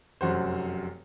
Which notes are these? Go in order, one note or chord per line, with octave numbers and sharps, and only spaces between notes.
F1 F#2 F#4 C5